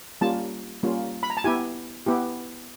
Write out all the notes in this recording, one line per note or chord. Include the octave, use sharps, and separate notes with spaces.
G3 A#3 C#4 F4 A5
G3 A#3 C#4 F4
B5
A#5
A5
B3 E4 G4 G#5
B3 E4 G4